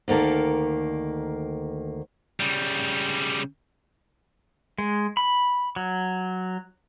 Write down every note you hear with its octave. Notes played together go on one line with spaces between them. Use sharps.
D2 D#3 A#3 A4
C#3 G3
G#3
B5
F#3